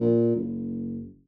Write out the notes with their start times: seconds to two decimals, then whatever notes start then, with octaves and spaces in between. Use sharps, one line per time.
0.01 A#2
0.36 F#1